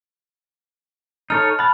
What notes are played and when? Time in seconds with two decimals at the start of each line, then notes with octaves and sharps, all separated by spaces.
1.30 D#4 A4 C#5 F6
1.59 F#5 A5 B5